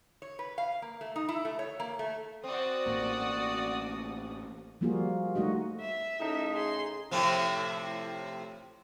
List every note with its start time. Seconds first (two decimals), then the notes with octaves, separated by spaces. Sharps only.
0.22 C#5
0.39 B4
0.58 F5
0.82 A#3
1.01 A3
1.16 D#4
1.29 E4
1.45 A3
1.59 C#5
1.80 A#3
1.99 A3
2.44 C4 F#4 D5 D#6
2.86 A1 A2 A#3
4.81 F3 G3 A#3 F4 F#4 G#4
5.35 G3 A3 D#4 F#4 D#5
5.80 E5
6.20 A2 C#3 D#4
6.53 G#4 C6
7.11 A2 C3 F3